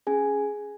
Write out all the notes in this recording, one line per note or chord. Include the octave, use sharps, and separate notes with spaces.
C#4 G#4 G#5